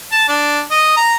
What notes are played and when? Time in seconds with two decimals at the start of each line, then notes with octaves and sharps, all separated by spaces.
0.12 A5
0.28 D4
0.71 D#5
0.97 A#5